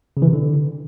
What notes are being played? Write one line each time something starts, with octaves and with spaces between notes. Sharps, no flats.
C#3
E3
C3
D3